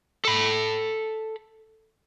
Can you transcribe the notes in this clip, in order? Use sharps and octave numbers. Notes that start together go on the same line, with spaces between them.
A4 B5